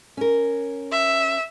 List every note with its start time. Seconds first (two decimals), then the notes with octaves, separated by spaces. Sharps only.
0.17 C#4 A#4
0.92 E5